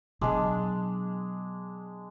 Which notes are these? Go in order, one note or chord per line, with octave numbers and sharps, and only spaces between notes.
B2 F#3 G#3 D4